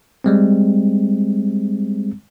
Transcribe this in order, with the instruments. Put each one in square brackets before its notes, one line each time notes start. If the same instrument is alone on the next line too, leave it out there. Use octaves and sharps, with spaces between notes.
[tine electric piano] G3 G#3 C4